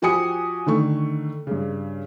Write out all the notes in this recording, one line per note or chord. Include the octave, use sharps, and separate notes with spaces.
F3 F#4 G4 G#5 D#6 C#7
D3 D#3 A3 C#6
G2 C#3